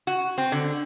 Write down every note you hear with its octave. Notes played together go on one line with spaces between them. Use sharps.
F#4
C4
D3